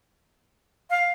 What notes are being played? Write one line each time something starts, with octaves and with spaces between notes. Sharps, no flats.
F5